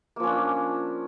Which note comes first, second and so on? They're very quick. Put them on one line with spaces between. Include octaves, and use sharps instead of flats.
A#3 F3 C#4 D4